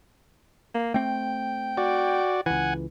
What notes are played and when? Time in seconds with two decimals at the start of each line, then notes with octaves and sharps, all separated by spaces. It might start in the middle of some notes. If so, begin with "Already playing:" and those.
0.75 A#3
0.94 A3 C4 G5
1.77 F#4 D5
2.46 C#2 E3 F#5 G#5